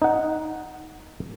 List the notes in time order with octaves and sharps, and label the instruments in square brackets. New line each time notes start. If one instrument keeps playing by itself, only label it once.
[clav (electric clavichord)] D#4 F#5